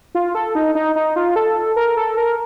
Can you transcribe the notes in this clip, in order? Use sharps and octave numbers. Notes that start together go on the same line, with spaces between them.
F4
A4
D#4
D#4
D#4
F4
A4
A#4
A4
A#4